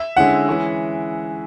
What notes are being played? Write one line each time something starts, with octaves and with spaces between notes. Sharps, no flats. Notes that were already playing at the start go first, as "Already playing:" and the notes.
Already playing: E5
D3 G#3 C#4 E4 F#5
E3 G#3 C#4 E4